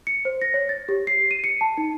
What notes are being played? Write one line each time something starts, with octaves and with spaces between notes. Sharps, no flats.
C#7
C5
A#6
C#5
A6
G4
C7
D#7
C#7
A5
D#4